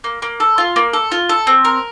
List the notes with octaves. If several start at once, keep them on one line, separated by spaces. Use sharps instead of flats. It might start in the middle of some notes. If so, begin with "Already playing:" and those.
A#3
A#3
A4
F4
A#3
A4
F4
A4
C4
A#4